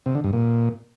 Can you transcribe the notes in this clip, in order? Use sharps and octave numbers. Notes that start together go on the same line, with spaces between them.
C3
D3
G2
A#2